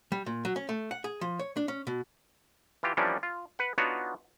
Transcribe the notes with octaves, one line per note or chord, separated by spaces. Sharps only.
G3
A#2
F#3
C#4
A3
F#5
G#4
F3
C#5
D4
C#4
B2
E3 F4 G4
E3 F3 G3 A#3 C#4 D4
F4
B4 F#5
B3 D4 D#4 F4 F#4 C#5